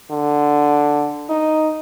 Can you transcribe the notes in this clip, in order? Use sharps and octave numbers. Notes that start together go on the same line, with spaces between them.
D3
D#4